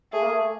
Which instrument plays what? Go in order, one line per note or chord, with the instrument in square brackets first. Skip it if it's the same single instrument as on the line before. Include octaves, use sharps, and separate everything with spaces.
[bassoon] A3 [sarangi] G#4
[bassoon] A#3
A3